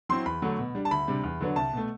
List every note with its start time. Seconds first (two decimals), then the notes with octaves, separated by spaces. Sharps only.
0.09 F#3 C4 E4 C6
0.25 E2 B5
0.42 D3 F#3 A3
0.58 B2
0.75 G3 D4
0.85 A5
0.91 D2 B5
1.08 C3 G3 D4
1.24 E2
1.41 D3 F#3 B3 D4
1.56 C2 A5
1.73 B2 A3